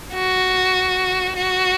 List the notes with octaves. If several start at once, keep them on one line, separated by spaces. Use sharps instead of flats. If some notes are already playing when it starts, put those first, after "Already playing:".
F#4
F#4